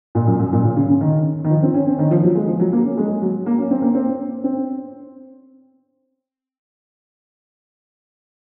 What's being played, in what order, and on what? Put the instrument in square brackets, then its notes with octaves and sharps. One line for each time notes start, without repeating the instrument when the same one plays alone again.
[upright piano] A#2
F#2
F#2
A#2
C#3
C#3
C#3
D#3
D#3
F3
C4
C#4
C4
D#3
F3
F#3
G#3
F3
F#3
A#3
C#4
G#3
F#3
A#3
C#4
C4
A#3
C4
C4